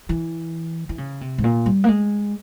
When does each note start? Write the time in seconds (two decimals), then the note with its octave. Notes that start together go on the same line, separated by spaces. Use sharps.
0.09 E3
0.89 E3
0.98 C#3
1.21 C3
1.38 G#2
1.44 A#2
1.66 G3
1.84 A#3
1.88 G#3